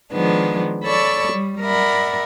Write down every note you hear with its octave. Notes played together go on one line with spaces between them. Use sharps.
D#3 F3 G#3 B3 D4
A4 C#5 D5 B5 C#6 E6
G3
A#4 D5 E5 F#5 B5